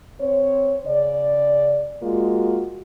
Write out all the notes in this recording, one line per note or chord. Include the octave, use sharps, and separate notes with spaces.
C4 C5 C#5
C#3 D5
G#3 A#3 F4 F#4